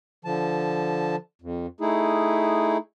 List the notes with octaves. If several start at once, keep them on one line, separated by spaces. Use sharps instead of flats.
D3 F3 A5
F2
A3 D#4 E4 G#4